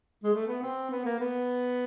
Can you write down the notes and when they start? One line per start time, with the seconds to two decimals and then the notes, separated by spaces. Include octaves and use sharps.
0.23 G#3
0.33 A3
0.47 B3
0.62 C4
0.91 B3
1.05 A#3
1.19 B3